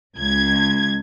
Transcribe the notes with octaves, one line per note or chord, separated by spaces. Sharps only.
C#2 G#6